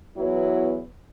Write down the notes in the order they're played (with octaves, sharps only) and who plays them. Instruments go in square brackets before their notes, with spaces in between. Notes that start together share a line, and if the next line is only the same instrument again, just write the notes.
[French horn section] E2 F#3 B3 E4